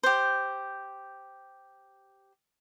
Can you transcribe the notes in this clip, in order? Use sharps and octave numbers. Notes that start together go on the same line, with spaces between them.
G4 C5